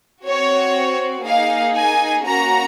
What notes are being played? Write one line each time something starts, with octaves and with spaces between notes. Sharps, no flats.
C4 F#4 C#5
A#3 D#4 G#4 F5
G#5
A#3 C#4 F#4 A#5